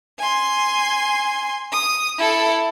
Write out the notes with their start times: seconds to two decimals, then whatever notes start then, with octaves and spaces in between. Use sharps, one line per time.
0.19 G#5 C6
1.72 D#6
2.18 E4 A4